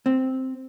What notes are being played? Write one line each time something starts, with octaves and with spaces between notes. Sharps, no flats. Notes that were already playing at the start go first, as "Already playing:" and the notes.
C4